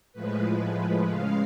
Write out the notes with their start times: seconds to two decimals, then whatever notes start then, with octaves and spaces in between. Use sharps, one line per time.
0.13 A2 F3 G#3 B4
1.10 C#3 G#3 F5